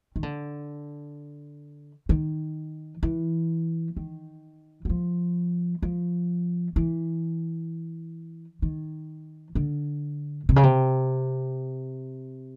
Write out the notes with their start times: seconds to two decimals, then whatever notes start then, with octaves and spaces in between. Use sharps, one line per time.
0.16 D#3
0.23 D3
2.09 D#3
3.03 E3
3.97 D#3
4.85 F#3
4.89 F3
5.82 F3
6.76 E3
8.62 D#3
9.55 D3
10.49 C3
10.56 C#3
10.63 C3